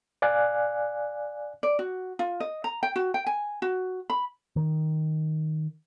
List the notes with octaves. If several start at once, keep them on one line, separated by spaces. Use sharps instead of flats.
D5 F5 G#5 F#6
D5
F#4
F4
D#5
A#5
G5
F#4
G5
G#5
F#4
B5
D#3